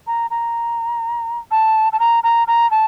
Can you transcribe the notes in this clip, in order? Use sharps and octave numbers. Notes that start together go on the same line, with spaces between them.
A#5
A#5
A5
A5
A#5
A#5
A#5
A5